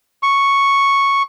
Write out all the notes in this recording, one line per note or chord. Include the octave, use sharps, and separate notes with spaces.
C#6